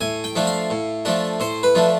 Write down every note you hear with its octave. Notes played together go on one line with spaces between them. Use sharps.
A2 G#5
G5
F3 A3 D4
F5
A2
F3 A3 D4
A2 C5
B4
F3 A3 D4